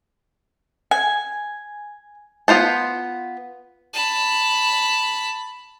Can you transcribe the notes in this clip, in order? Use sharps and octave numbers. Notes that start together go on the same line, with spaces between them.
G#5
B3 F4 C5 A5
A5 B5